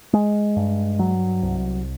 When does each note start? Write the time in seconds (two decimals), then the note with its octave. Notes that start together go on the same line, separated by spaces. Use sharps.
0.13 G#3
0.56 G2
0.99 F#3
1.42 C2